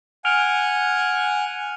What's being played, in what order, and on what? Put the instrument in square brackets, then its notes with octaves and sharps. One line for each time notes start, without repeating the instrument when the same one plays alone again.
[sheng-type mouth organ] F#5 G#5 [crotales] F6 D7 F7